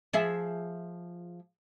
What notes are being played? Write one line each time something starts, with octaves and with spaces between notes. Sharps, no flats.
F3 G#4 E5